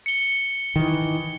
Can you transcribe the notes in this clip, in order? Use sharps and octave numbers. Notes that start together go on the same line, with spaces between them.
C#7 G7
D#3 E3